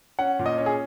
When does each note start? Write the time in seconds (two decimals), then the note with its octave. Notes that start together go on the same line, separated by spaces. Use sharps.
0.19 C#4 F#5
0.39 A#2
0.46 D#5
0.58 C#4
0.66 G#4